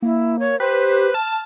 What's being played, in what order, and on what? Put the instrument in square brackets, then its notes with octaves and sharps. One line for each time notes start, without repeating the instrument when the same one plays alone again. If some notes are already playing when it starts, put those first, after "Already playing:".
[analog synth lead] A#3 [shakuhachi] E4
[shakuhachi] C#5
[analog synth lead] G4 [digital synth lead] B4 [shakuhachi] C5
[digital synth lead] A5 [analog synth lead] F6